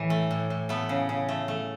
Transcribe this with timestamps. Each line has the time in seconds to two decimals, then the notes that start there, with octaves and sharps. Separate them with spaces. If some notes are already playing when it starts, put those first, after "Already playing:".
Already playing: A2 E3
0.10 A3
0.31 A2
0.50 A2
0.69 A3 B3
0.89 C#3
1.09 C#3
1.29 A3
1.48 A3